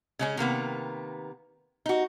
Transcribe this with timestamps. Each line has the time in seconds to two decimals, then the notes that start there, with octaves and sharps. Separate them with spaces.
0.19 C#3 G#3 C#4
0.37 C3 D#3 A#3 B3
1.86 D#4 F#4